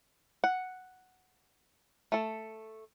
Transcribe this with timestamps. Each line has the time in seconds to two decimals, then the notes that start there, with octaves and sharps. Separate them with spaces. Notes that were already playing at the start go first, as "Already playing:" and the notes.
0.44 F#5
2.12 A3 A4